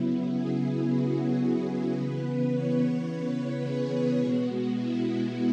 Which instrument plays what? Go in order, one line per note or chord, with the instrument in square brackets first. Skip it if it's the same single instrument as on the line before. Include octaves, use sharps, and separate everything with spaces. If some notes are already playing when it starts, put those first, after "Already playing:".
Already playing: [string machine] C#3 F#3 B3 E4
G#4
F#4
G#4
C#3 E3 B3 B4
C#5
B4
G#4
B2 G#3 B3 F#4
E4